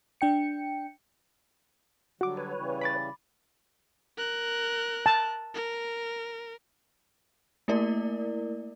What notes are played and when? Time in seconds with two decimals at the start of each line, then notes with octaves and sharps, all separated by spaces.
0.21 D4 G5 C#7
2.21 D3 F#3 G3 F#4 D6
2.37 B4 C#5
2.55 C#3 E3 G3
2.81 B5 D6 A6
4.17 A#4 F#6
5.06 A5
5.54 A#4
7.68 A3 A#3 E4 A#4 D5